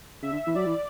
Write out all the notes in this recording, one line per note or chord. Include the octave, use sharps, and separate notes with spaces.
C#3 E5
D3
E3
F#3 D5
E3